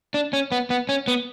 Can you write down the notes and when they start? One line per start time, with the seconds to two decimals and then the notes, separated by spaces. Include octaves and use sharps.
0.14 D4
0.33 C#4
0.52 B3
0.70 B3
0.89 C#4
1.08 B3